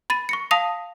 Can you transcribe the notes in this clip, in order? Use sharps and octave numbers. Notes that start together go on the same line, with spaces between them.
B5 A6 D#7
C#6 A#6 C#7
F5 A5 D#6 A#6 F7